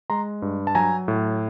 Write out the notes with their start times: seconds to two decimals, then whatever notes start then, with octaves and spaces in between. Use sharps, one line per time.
0.10 G#3 A#5 C6
0.42 G2
0.67 A5
0.75 F#3 G#5 A#5
1.08 A2